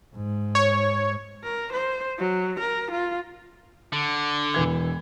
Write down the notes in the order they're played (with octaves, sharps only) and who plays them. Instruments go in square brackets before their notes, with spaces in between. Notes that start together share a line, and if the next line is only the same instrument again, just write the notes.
[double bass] G#2
[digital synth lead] C#5
[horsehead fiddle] A#4
C5
F#3
A#4
F4
[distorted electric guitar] D3
[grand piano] E1 E3 G#6